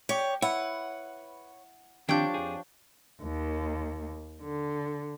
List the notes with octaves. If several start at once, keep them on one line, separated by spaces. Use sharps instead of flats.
G4 C#5
E4 B4 C#5 F#5
D#3 F3 C4 D4 G4 C#5 G5 G6
F2 G#4
D#2
D3